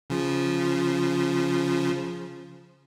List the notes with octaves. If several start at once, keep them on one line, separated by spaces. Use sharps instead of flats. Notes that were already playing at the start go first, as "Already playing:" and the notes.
C#3 F3